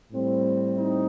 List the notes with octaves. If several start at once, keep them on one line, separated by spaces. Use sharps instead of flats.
A2 G3 C4
D#4